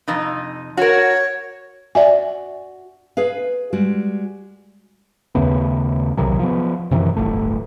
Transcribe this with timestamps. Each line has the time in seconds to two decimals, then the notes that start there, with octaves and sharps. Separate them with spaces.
0.08 F2 C3 D#4
0.77 F#4 A#4 C#5
1.95 F#4 D5 E5 G#5
3.17 G#4 B4 F5
3.73 G3 G#3 F#4
5.35 D#2 C#3 A3 B3
6.17 B1 C3 D#3 F#3
6.39 F3 B3
6.91 F#2 C3 D#3 E3
7.17 D1 G1 A3